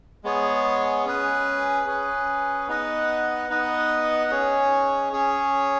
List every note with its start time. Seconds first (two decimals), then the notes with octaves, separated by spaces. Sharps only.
0.24 G#3 B3 G#4 C#5
1.05 C#4 G#4 B4
1.87 C#4 G#4 B4
2.68 B3 D#4 B4 D#5 F#5
3.50 B3 D#4 B4 D#5 F#5
4.31 C#4 G#4 C#5
5.13 C#4 G#4 C#5